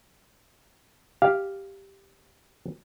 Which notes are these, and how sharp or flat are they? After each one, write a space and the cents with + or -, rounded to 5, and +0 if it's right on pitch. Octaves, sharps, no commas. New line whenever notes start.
G4 +0 F5 +0